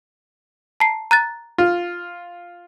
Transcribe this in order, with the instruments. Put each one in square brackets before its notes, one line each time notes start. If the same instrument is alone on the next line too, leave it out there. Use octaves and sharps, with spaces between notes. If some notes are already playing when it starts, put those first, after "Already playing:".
[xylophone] A5 A#5 C7
A#5 F#6 A6
[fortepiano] F4